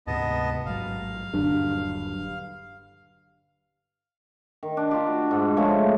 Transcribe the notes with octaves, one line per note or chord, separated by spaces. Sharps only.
D2 G#2 C3 B3 D#5 A5
A1 G#2 F#3 F5
D#1 G2 D3 F#3 D4
D#3
D4
D4 F4 G4
F#4
G#2
C#3 F3 G#3 A3